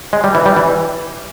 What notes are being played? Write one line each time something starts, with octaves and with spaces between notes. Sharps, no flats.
G#3
G3
E3
G3
E3